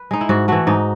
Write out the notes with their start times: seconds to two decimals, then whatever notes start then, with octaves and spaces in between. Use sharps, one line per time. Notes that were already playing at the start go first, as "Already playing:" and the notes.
Already playing: B4
0.11 G#3 D#4
0.21 E4
0.29 G#2 F#4
0.48 E3 A3 F#4
0.67 G#2 D#4